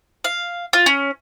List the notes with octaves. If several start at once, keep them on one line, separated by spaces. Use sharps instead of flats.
F5
F4
C#4